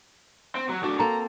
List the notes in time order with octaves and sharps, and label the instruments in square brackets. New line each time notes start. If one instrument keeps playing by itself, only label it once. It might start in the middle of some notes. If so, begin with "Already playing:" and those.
[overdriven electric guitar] C4
F#3
[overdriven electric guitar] A2 D4 [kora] F#4
[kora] A#3 C4 A4 [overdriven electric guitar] A#5